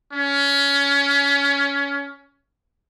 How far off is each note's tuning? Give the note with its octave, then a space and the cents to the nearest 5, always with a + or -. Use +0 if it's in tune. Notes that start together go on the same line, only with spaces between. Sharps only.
C#4 +20